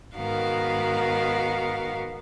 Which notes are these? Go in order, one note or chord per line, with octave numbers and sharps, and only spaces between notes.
G#2 D#3 B3 F#4 A#4 F5